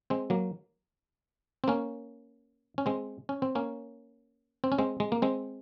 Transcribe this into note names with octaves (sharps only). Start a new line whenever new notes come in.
G#3 C4
F#3 A#3
C4
A#3 C#4
C#4
G#3 C4
C#4
C4
A#3 C#4
C4
C#4
G#3 C4
G#3
A#3
G#3 C4